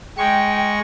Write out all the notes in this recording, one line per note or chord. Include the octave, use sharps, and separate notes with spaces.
G#3 G5 C#6